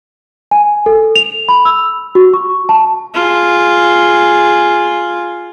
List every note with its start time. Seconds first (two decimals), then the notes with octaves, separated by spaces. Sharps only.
0.51 G#5
0.86 A4
1.16 F7
1.49 B5
1.65 E6
2.15 F#4
2.34 C#6
2.69 A5
3.14 F4 G#4